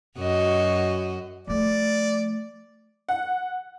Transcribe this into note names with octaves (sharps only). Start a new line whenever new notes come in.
F#2 F#4 D#5
F3 A3 D5
F#5